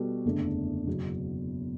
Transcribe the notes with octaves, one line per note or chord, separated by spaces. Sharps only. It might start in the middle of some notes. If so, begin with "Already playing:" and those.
Already playing: B2 G3 B3 F#4 A4
F#1 E2 D3 A3 D4
F#1 E2 B2 F#3